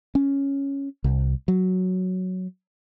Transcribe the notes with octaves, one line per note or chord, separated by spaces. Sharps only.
C#4
C2
F#3